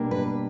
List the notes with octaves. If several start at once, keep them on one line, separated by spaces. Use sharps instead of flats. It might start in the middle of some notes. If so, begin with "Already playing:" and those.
Already playing: B2 G3 A#3 D4
B4